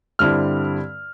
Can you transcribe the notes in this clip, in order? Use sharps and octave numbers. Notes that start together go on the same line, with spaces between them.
G2 D3 G3 C4 E4 F6